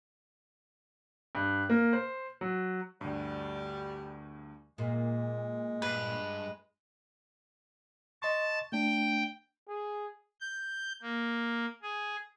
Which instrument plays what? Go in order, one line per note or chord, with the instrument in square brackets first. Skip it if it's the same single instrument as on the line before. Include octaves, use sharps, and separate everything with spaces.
[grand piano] G2
A#3
C5
F#3
[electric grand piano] D2 G2 [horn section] G3
[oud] A#2 [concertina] G#3
[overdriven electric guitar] G2 [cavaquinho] B4
[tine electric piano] D#5 C6 C#6 [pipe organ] A5
[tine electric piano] A3 D4 [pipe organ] G5
[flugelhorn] G#4
[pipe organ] G6
A#3
G#4